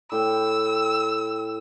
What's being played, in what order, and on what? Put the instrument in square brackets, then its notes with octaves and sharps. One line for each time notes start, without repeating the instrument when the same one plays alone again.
[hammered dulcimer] A2 G5 [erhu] E6